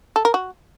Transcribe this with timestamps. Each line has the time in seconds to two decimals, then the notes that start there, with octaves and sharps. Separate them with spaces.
0.16 A4
0.25 A#4
0.34 F#4